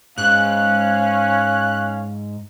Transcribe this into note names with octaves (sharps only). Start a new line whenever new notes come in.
G#2 C#4 F5 F#6